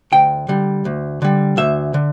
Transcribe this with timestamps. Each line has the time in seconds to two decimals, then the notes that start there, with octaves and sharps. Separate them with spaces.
0.12 D2 G5
0.48 D3 G3
0.85 D2
1.22 D3 G3
1.57 D2 E5
1.94 D3